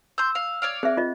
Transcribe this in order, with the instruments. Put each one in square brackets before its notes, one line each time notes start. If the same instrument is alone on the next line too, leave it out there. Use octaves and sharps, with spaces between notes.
[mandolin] C6 G6 [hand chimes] E6
[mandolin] F5
C#5 D5 F5
[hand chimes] C4 [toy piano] G#4 E5
[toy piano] F4 D#5